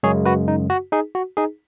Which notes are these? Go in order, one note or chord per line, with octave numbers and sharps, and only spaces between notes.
F#2 C#3 G#3 G#4 C#5
F#4 B4
D#4
F#4
D#4 G#4
F#4
D#4 G#4